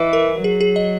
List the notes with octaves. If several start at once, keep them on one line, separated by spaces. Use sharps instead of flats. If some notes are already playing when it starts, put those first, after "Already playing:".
Already playing: E3 B4 D#5
A#4
F#3 G#4
G#4
D#5